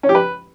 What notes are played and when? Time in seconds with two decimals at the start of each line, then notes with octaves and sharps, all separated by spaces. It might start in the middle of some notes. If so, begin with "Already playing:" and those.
0.03 C#4
0.09 G4
0.15 B4